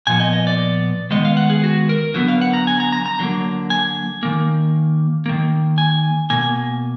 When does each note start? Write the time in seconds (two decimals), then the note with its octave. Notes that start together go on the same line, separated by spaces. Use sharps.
0.07 A#2 F3 B3 G#5
0.20 D#5
0.33 D#5
0.47 D5
1.11 D#3 G#3 B3 D#5
1.25 F5
1.37 F#5
1.50 G#4
1.64 F#4
1.89 A#4
2.14 D3 F#3 B3
2.28 F5
2.41 F#5
2.53 A#5
2.67 G#5
2.80 A#5
2.92 A#5
3.06 A#5
3.19 D3 F#3 A#3
3.70 G#5
4.23 D#3 A#3
5.26 D#3 A#3
5.78 G#5
6.30 B2 A#3 G#5